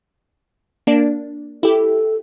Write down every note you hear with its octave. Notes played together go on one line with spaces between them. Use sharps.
A#3 D4
E4 G4 A4